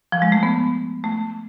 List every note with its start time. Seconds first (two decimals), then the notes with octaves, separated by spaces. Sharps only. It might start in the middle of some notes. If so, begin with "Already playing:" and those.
0.12 F3
0.22 G#3
0.32 A3
0.43 B3
1.04 A3